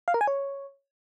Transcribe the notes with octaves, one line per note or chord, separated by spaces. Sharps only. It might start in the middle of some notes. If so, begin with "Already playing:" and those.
F5
A#4
G#5
C#5